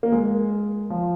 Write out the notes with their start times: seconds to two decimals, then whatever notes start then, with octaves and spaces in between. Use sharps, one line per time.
0.03 A#3
0.12 G#3
0.90 F3